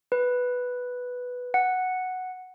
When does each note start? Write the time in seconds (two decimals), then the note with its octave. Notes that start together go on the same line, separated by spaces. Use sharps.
0.12 B4
1.54 F#5